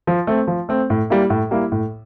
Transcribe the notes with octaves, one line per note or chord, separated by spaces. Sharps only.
F3
A3 C4
F3
A3 C4
A2
G3 A#3 E4
A2
G3 A#3 E4
A2